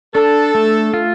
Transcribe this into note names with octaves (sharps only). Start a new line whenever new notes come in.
D4 A4
A3
F4